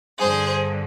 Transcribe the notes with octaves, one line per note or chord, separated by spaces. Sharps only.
G2 D3 G#4 C5